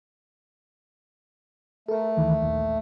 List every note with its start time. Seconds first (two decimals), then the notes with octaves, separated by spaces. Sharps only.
1.88 A3 A4 A#4
2.17 D2 D#3 E3
2.42 A#1 D#2